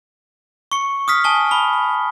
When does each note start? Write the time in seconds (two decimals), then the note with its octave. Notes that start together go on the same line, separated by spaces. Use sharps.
0.72 C#6 C#7
1.08 D#6 F6 B6
1.24 G#5 A5 G7
1.51 B5 G7